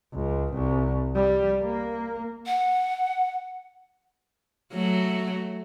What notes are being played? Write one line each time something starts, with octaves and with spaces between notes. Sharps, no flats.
C#2
C2
G3
A#3
F#5
F#3 A3